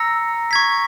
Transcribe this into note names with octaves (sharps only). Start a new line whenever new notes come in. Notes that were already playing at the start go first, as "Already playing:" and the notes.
Already playing: A#5 E6 A#6 C#7
C#6 G#6 B6